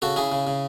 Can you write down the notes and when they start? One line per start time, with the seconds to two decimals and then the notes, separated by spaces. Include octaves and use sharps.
0.02 C#3 F#4 A4
0.16 C#3 E4 G#4
0.32 C#3
0.47 C#3